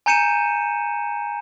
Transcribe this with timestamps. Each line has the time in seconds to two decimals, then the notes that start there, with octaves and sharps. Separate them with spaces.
0.06 G#5 A#5 G6 C#7 D#7 E7